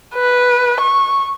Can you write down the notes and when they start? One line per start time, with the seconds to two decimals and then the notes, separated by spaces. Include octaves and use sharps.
0.15 B4
0.81 C#6